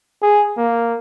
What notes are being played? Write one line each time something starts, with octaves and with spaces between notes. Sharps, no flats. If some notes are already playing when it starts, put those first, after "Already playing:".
G#4
A#3